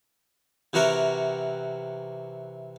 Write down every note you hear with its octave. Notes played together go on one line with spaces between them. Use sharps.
C3 E3 F#4 A#4